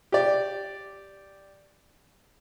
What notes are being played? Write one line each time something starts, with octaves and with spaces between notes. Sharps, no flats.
G4 D5